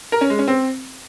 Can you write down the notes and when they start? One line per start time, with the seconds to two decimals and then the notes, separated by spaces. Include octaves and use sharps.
0.12 A#4
0.21 C#4
0.30 G#3
0.39 C#4
0.48 C4